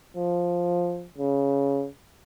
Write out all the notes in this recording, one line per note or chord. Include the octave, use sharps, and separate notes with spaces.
F3
C#3